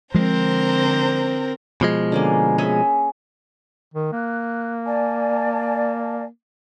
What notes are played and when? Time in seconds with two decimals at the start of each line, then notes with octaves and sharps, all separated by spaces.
0.14 D3 F3 G#3 C4 A#4 C5 A#5
1.81 B2 F3 G#3
2.12 D3 A#3 C#4
2.58 C#4 G#4 E5
3.94 D#3
4.12 A#3 F#6
4.86 D5 G#5 A5